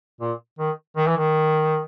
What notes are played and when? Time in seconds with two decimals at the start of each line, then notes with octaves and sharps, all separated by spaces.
0.21 A#2
0.59 D#3
0.97 D#3
1.07 E3
1.18 D#3